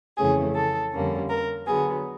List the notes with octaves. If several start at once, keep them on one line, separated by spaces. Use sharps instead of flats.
F2 C#3 E3 A3 C#4 G#4
A4
F2 D3 G3 A#3 C#4
A#4
D3 F#3 B3 G#4